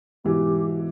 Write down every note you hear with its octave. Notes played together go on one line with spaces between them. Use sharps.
G#2 B2 E3 G4